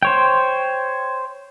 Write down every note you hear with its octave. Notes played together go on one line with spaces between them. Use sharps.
C5 C#5 G5